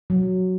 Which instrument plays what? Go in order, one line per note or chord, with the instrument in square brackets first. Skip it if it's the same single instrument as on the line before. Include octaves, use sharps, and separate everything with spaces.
[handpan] F#3